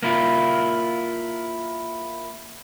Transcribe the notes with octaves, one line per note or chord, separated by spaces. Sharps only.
A#3 E4 F4